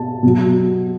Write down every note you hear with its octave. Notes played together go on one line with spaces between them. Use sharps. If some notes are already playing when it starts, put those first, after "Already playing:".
Already playing: B2 A5
B2 F#3